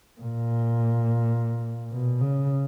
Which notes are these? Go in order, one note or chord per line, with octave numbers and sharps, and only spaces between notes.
A#2
B2
C#3